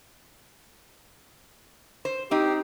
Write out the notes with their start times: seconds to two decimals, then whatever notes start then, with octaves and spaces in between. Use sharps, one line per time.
2.05 C5
2.31 C4 D#4 G4